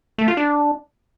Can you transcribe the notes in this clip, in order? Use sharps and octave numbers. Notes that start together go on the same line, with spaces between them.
A3
F4
D4